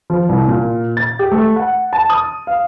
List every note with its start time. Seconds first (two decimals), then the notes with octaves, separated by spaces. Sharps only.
0.10 F3
0.29 C2
0.48 A#2
0.97 A6
1.19 G4
1.32 A3
1.56 F#5
1.93 A5
2.10 D#6
2.47 F5